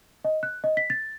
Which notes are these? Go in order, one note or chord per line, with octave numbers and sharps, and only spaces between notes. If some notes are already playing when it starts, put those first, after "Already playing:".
D#5
F#6
D#5
B6
A6